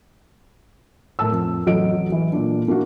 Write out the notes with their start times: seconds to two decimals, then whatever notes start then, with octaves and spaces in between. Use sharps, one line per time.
1.19 A2 A#4 A5 E6
1.31 F2
1.66 A1 F#3 A4 D#5 D7
2.12 E3
2.32 A#2 D4
2.68 A#3 D4 E4 F#4